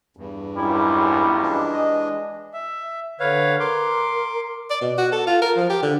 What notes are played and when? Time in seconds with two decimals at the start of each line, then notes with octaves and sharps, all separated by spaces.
0.17 E2 G2
0.57 C#2 F#2 G3 E4
1.42 E3 G#3 D4
1.74 D#5
2.53 E5
3.20 D3 B4 C#5 F5
3.60 A#4 C6 D6
4.70 D5
4.82 B2
4.98 F#4
5.13 A4
5.27 F4
5.42 A#4
5.57 F3
5.70 G4
5.82 D3